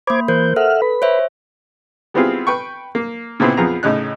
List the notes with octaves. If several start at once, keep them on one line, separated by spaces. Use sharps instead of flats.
A#3 C5 B5 D6 G#6
E3 A#4 C5 G6
A4 E5 F#5 F6
B4 B5
C5 C#5 E5
G3 B3 C4 E4 F4 G#4
B4 G5 C#6
A#3
A#2 C#3 B3 C4 E4 G#4
F2 B3 F4 G#4 A#5
A2 C#3 D#4 F#6